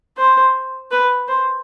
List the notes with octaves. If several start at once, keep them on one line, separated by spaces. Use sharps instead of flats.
C5
B4
C5